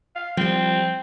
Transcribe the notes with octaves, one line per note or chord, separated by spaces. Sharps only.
F5
F3 G3 C4